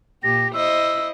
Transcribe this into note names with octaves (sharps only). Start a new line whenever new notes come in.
A#2 G4 A#6
E4 C5 D#5 E6